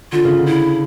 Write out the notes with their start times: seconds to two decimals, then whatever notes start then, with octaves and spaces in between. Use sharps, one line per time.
0.12 D3 F4
0.25 C#3
0.38 D3
0.46 E4